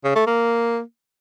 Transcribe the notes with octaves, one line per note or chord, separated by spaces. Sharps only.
C#3
A3
A#3